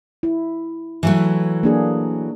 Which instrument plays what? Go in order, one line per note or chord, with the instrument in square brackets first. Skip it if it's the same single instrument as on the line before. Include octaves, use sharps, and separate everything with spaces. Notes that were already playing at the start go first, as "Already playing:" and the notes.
[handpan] E4
[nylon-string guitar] E3 F#3 A3
[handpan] A#3 D4 G#4